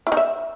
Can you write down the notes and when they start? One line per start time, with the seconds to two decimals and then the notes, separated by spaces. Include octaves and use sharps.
0.07 E4
0.12 D#4
0.17 E5